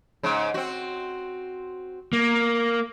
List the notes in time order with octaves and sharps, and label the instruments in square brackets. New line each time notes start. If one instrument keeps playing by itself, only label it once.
[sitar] G#2 C#3
C4 F#4
[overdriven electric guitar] A#3